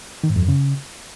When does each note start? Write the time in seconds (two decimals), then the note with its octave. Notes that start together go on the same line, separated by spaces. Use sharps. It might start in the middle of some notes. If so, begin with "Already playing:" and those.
0.24 D#3
0.30 G#2
0.36 F2
0.42 F#2
0.49 C#3